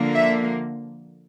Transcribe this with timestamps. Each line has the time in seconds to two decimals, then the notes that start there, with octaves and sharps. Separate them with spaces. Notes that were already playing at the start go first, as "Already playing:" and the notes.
Already playing: D3 F3 A#3
0.15 E5